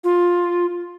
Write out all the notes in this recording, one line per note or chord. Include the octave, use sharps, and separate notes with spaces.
F4